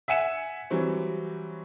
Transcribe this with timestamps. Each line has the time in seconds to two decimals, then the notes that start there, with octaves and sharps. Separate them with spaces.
0.08 E5 F#5 G#5 C#7 E7
0.70 E3 F#3 G3 C4